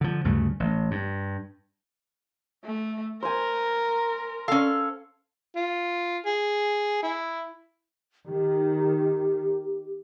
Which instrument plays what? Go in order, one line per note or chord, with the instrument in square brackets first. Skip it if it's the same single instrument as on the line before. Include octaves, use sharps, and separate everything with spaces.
[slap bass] D3 F3
D2 G2 C#3 A3
A1
G2
[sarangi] A3
[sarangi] A#4 [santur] C5 G#5
[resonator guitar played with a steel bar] C#4 F5 [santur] A4
[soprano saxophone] F4
G#4
E4
[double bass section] D#3 [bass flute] G4